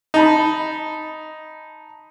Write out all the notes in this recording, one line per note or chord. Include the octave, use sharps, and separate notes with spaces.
D#4 A5 B5